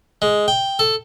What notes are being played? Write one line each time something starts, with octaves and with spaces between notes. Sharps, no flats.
G#3
G5
A4